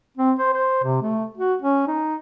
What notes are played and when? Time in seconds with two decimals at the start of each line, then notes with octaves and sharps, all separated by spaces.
0.17 C4
0.39 C5
0.53 C5
0.83 C3
1.03 A3
1.38 F#4
1.62 C#4
1.88 D#4